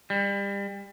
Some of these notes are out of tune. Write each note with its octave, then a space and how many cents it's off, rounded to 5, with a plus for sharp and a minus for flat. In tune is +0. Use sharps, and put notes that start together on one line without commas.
G3 +30